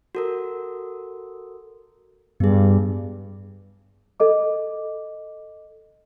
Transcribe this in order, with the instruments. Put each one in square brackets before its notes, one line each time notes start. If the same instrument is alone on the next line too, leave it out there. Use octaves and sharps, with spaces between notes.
[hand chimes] F#4 A4 A#4
[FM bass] G2 [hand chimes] B3 G#4
[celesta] A4 D#5 D6